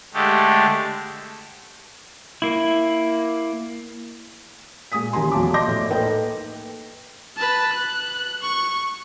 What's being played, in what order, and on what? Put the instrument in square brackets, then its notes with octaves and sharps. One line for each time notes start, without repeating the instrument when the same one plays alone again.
[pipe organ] D3 G#3 A3 G4
[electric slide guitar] A#3 E4
[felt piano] A#2 G#3 G#5 D#6 B6
A1 D#3 G4 G#5 A#5 C6
E2 F3 F#3 A5 D6
D5 D#5 C6 D6 G6 A#6
A2
A#3 D#4 A4 B4 D#5 G5
[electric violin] B4 A5
F#6
C#6